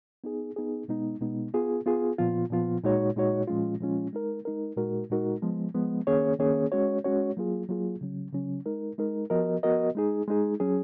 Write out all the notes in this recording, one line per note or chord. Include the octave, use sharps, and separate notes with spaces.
B3 D#4 G#4
B3 D#4 G#4
B2 G#3 B3 D#4
B2 G#3 B3 D#4
B3 F4 G#4
B3 F4 G#4
A#2 F3 B3 F4
A#2 F3 B3 F4
A#2 G#3 D#4 F#4 C#5
A#2 G#3 D#4 F#4 C#5
A#2 F3 G#3 C#4 F4
A#2 F3 G#3 C#4 F4
G#3 D#4 A#4
G#3 D#4 A#4
A#2 G#3 D#4 F#4 A#4
A#2 G#3 D#4 F#4 A#4
F3 G#3 B3
F3 G#3 B3
D#3 A#3 C#4 G#4 C#5
D#3 A#3 C#4 G#4 C#5
G#3 C#4 F#4 C#5
G#3 C#4 F#4 C#5
F#3 A#3 F4 G#4
F#3 A#3 F4 G#4
C#3 F#3 C#4
C#3 F#3 C#4
G#3 D#4 A#4
G#3 D#4 A#4
F3 B3 F#4 A#4 D#5
F3 B3 F#4 A#4 D#5
G#3 D#4 G#4
G#3 D#4 G#4
F#3 C#4 G#4